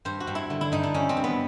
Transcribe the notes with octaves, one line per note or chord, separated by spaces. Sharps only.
G2 C5
F#4
G2
E4
D3
E4
G2 D#4
D4
G2 C#4
C4
G2
B3